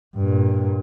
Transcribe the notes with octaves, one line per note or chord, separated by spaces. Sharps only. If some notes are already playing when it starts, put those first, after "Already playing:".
G2 A#2